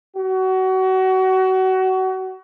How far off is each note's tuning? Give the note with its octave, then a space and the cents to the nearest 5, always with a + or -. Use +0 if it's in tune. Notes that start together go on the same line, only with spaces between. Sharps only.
F#4 +25